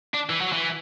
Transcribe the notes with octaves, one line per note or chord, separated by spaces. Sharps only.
D4
E3
F#3
E3